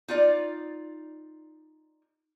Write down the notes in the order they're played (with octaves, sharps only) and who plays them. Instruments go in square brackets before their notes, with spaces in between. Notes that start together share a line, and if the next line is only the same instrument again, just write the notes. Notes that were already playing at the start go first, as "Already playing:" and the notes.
[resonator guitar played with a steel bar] D#4 F4 D5